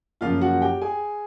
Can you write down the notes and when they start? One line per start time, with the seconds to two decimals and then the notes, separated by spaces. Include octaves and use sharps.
0.21 F#2 C#3 F3 A#3 F4 F5
0.41 F#4 F#5
0.62 G4 G5
0.81 G#4 G#5